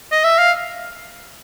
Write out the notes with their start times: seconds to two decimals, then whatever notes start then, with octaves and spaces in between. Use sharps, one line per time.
0.12 D#5
0.24 E5
0.38 F5